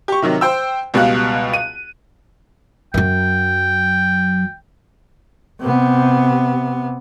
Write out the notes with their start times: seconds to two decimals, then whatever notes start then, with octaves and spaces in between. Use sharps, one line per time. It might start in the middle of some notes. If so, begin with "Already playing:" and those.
0.08 G4 C#6
0.22 C3 D#3 F#3
0.41 C5 G5 E6
0.94 C#2 B2 G3 F5 F#6
1.54 D#7
2.94 F#2 F#3 G5
5.61 C3 B3